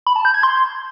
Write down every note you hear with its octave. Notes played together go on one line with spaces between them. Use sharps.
B5
A5
G6
G#6
C6